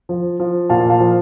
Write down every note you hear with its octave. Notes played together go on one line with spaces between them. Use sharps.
F3
F3
A#2 F5 A5
F5 A5
F3